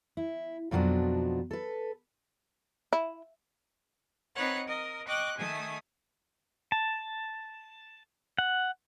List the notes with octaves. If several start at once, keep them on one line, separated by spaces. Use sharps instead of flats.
E4
F2 B2 F3 F#3 D4
A4 B4
E4
C4 D#4 B4 C#5 F#5
A#4 D#5
D#5 G5 C#6 D6 F#6
D#3 A3 G#5 D#6
A5
F#5